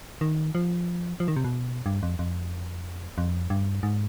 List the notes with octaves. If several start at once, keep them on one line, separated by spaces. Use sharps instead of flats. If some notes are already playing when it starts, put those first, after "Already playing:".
D#3
F3
F3
D#3
C3
B2
G2
F2
F2
F2
G2
G#2